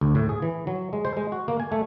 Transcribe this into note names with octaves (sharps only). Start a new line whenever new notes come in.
D2
A2
G#4
E3
F#3
G#3
C5
G#3
F#4
A#3
G#5
A3